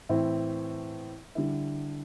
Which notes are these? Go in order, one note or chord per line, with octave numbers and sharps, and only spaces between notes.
A2 E3 C4 E4
D3 G3 E4